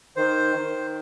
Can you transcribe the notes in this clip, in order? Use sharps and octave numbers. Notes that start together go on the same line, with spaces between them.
D#3 C5
D#3